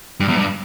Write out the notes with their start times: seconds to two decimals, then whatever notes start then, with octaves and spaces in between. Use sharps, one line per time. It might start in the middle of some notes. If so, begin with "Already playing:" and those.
0.20 G2
0.28 E2
0.37 G2